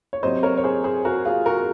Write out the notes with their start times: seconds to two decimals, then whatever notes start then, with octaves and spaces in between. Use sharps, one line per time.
0.13 C#5
0.23 C3 F#3 C5 D#5
0.43 A#4 C#5
0.57 C#5
0.64 G#4 C5
0.84 G#4 C5
1.05 F#4 A#4
1.25 F4 G#4
1.46 F#4 A#4